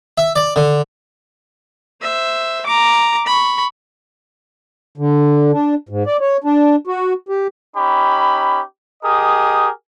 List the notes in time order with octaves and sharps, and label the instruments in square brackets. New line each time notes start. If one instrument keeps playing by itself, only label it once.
[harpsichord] E5
D5
D3
[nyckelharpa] C5 E5
A#5 D6
B5 C#6
[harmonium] D3
D4
G#2
D5
C#5
D4
F#4
G4
[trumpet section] C#4 D#4 G4 B5
G4 G#4 A#4 D#5 D#6